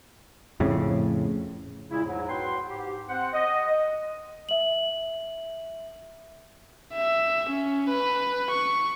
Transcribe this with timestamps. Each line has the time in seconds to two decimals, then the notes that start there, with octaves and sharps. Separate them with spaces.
0.60 F2 A2 C#3
1.90 A#2 C#3 G#3 E4
2.04 E2 G#2 F#3
2.29 F#4 B4 G5 C6
2.67 G#2 G4
3.09 C4 C5 F#5
3.33 D#5
4.49 E5 F#7
6.93 E5
7.50 C#4
7.89 B4
8.50 C#6